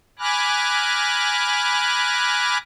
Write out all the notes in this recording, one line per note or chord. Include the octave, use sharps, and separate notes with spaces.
G#5 B5 D6 F6 F#6 A#6